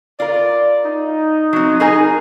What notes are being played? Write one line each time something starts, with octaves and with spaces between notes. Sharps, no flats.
F4 A#4 D5
D#4
F#3 C4
D#4 G#4 A#4 G#5